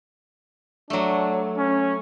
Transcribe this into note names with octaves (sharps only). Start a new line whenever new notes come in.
F#3 A3 D4
C#4